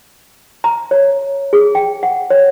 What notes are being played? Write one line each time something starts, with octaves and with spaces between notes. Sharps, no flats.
A#5
C#5
G#4
G5
F#5
C#5